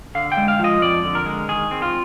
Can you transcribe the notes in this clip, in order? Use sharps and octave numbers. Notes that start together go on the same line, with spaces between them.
D3 F5
G5
G#3
F5
F3 D#5
F2 D5
D3
A#4
G#3
D#3 G#4
C4
F4